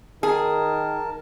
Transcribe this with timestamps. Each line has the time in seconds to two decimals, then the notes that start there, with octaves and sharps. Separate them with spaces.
0.23 D#3 G#4 A#4 A5